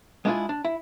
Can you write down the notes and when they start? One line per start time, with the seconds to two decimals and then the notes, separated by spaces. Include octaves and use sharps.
0.25 G#3 B3 D4 E4 F4 G#4
0.49 D4
0.65 E4